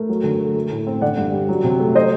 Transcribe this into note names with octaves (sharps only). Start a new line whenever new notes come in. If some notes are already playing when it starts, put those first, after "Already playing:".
Already playing: A3 A#4
F#3
D3
A3
A3
A2
C4
D3 D5 F#5
G2
G3
F#3
C3
A3
F#3 C5 D#5